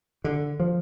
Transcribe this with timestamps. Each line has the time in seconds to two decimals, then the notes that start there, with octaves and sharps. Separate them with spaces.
0.24 D3
0.60 F3